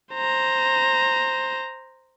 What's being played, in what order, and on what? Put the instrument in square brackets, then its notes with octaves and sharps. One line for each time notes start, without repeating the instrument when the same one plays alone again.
[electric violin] C5 A#5